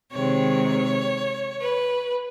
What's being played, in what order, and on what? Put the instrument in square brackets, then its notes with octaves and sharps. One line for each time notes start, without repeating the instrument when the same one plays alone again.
[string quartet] C3 D#3 G#3 C4 C#5
B4